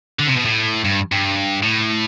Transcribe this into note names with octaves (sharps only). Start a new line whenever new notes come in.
D3
C3
B2
A2
G2
G2
A2